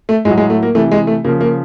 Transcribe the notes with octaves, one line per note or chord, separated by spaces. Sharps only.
A3
A2 F#3 G#3
G#3
A3
A#3
C3 E3 A3
G#3
A3
C#3 F3 A#3
A#3